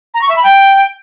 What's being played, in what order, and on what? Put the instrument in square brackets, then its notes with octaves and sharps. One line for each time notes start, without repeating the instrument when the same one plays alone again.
[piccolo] A#5
C#6
E5
B5
G5